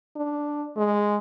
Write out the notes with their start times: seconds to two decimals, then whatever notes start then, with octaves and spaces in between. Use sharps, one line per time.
0.16 D4
0.77 G#3